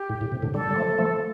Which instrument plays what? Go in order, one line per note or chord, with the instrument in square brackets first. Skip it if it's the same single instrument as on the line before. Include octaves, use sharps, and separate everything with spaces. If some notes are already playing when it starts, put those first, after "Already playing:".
Already playing: [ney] G4
[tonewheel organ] A2
A2
C3
A2 D3
[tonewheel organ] D3 G3 [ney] A4
[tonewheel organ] G3
F3 A3
F3 A3